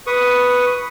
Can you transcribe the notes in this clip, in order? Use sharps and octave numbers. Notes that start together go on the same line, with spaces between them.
B4 C#6 D#6